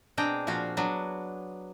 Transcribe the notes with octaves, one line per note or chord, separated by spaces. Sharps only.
B2 C4 D4 G#4 G5 A#5
A#2 F3 F4 F#4
F#3 B3 D4